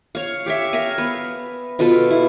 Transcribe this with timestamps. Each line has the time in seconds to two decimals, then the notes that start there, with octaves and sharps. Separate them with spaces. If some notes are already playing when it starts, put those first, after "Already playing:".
0.15 C#5 F5
0.46 G4 C#5 E5
0.73 A#4 E5 F5 G#5
0.98 B3 B4
1.79 B2 F4 A4 B4
2.11 E4